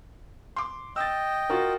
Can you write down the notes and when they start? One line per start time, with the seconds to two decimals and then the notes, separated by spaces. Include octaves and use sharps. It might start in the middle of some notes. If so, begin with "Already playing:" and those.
0.56 C6 D6
0.96 D#5 G5 E6 A6
1.50 F4 F#4 A#4